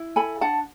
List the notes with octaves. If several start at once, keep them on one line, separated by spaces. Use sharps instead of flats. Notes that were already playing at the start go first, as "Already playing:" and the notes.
Already playing: E4
A4 G#5 B5
D4 F#5 A5